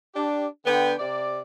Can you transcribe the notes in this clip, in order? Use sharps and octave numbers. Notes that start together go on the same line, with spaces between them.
D4 G4
D3 B3 G5
C3 D5